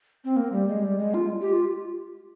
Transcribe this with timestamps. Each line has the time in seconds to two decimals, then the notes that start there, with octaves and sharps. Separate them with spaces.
0.25 C4
0.36 A#3
0.52 G3
0.68 G#3
0.83 G3
0.99 G#3
1.14 F4
1.42 G4
1.53 F4